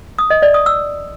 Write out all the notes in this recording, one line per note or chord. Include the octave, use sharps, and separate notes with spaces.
D#6
D#5
D5
D#6
E6